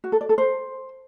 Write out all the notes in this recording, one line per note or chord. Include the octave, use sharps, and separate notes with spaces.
F#4
A4
D5
A4
C5